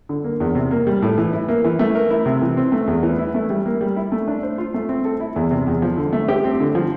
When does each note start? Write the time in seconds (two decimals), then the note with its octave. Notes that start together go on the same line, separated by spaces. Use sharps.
0.09 D3
0.24 A#3
0.40 E2
0.55 C3
0.71 A#3
0.87 G3
1.02 A2
1.18 E3
1.33 E4
1.48 A#3
1.64 E3
1.79 A3
1.95 A#4
2.10 E4
2.26 C3
2.42 E3
2.57 C4
2.72 A3
2.87 E2
3.03 E3
3.18 E4
3.34 A3
3.50 G3
3.66 A#3
3.81 G3
3.96 E4
4.12 A3
4.28 D4
4.43 C5
4.58 F4
4.74 A3
4.89 C4
5.05 A4
5.20 E4
5.36 E2
5.51 C3
5.67 E2
5.82 F3
5.98 D3
6.13 A3
6.29 G4
6.44 C4
6.60 D3
6.75 F3